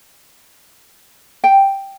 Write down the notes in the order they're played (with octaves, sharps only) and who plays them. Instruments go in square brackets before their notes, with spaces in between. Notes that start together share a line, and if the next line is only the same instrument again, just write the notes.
[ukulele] G5